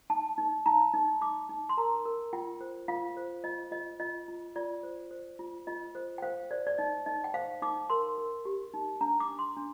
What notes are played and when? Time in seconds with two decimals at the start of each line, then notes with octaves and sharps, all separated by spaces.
0.10 D#4 A5
0.38 D#4
0.66 D#4 A#5
0.94 D#4
1.21 D#4 D6
1.49 D#4
1.69 C6
1.77 A#4 A#5
2.05 A#4
2.33 F4 G5
2.61 C5
2.88 F4 F5
3.17 C5
3.44 F4 D#5
3.72 F4 D#5
4.00 F4 D#5
4.28 F4
4.56 F4 D5
4.83 C5
5.11 C5
5.39 F4
5.67 F4 D#5
5.95 C5
6.18 G5
6.22 C5 F5
6.51 C5 D5
6.67 D5
6.78 D#4 D#5
7.06 D#4 D#5
7.24 G5
7.34 C5 F5
7.62 D#4 D6
7.90 A#4 C6
8.18 A#4
8.45 G4
8.74 D#4
9.01 D4 A#5
9.20 D6
9.29 D4
9.39 C6
9.57 D4